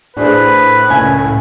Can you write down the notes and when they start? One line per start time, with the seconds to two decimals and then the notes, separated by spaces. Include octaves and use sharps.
0.17 A2 D4 G#4 B4 C5
0.90 C#2 G#5